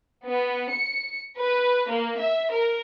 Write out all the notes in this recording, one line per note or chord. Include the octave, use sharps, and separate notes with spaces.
B3
C#7
B4
A#3
E5
A#4